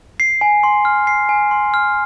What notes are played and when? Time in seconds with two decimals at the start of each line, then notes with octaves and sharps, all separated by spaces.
0.20 C7
0.41 G#5
0.63 C6
0.85 F6
1.07 C7
1.29 G#5
1.51 C6
1.74 F6